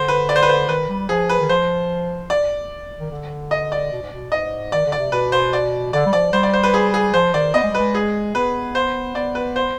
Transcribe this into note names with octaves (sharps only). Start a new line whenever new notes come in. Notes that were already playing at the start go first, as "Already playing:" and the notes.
Already playing: D3 C5
B4
D5
C5
B4
C5
D#3 B4
G3
F3 G#4
B4
D#3
F3 C5
D5
D#3
D3
D#5
D5
B2
G#2
B2
G#2 D#5
D#3 D5
D3
D5
C3
B2 B4
C5
D5
D3 D5
G3
F3 D5
G3 C5
D5
C5
B4
G#4
G#4
F3 C5
D#3 D5
B3 D#5
G#3
G3 B4
G#3
G#4
B3 B4
C5
B3 D5
B4
C5